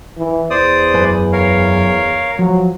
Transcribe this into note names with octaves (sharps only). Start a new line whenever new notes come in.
E3
E2 C5 D5 D#6
F#2 B4 G#5
A#4 C#5 F5
F3 F#3